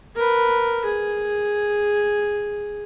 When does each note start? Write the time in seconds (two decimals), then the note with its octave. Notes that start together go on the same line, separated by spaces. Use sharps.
0.16 A#4 B4
0.85 G#4